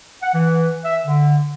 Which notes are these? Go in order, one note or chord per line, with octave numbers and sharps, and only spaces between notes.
F#5
E3
E5
D3